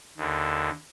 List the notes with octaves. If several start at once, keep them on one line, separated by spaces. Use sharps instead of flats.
D#2 D3